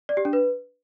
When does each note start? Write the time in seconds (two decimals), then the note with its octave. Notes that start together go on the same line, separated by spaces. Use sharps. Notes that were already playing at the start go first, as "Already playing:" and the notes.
0.09 D5
0.17 G4
0.25 D4
0.33 B4